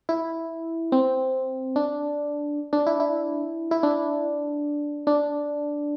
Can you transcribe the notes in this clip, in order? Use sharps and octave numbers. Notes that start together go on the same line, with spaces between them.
E4
C4
D4
D4
E4
E4
E4
D4
D4